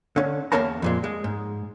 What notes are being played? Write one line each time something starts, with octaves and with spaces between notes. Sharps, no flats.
D3 C#4
E2 A#3 C#4 A#4 A5 A#5
F2 A#2 G#3
G#3
G#2